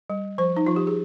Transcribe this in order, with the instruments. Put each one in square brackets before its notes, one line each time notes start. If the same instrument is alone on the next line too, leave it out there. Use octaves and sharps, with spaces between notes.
[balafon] G3
F3 C5
D#4
F3 F4
G4
G#4